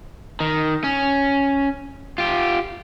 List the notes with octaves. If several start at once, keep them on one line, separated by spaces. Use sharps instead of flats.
D#3
C#4
F4 G4